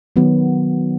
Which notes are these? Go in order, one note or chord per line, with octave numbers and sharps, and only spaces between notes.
D#3 F#3 B3